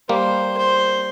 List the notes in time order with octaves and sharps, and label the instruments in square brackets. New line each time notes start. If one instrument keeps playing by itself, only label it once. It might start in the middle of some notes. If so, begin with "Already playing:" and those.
[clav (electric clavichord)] G3 A#3 [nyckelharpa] C5
[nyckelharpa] C5